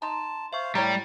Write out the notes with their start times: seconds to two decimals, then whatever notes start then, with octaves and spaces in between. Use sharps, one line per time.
0.02 D#4 A5 A#5 C6
0.53 C5 E5 F5 C#6
0.75 A2 G3 A#4 C#5